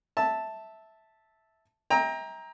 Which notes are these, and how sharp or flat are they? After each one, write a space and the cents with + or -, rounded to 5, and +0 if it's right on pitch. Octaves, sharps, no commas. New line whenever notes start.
E5 -10 A5 +0
E5 -40 G5 +30 A#5 +10